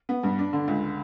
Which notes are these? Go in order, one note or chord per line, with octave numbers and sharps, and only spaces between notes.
B3
G2
D4
D3
C#2